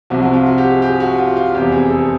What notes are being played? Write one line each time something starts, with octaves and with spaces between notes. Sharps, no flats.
C2 C3 F3 F#4
F#4
F4
F#4
G4
G#4
G4
F#4
F4
F4
F1 E2 C3 G4
G#4
A4